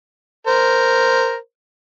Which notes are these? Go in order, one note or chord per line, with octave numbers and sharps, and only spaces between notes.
A#4 C5